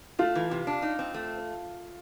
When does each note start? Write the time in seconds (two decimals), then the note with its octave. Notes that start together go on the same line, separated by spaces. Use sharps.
0.19 A3 F4
0.35 E3
0.51 C3
0.67 D4
0.82 D#4
0.99 C4
1.14 A3